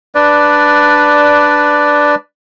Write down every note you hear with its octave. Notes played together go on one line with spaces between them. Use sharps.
D4 B4 D5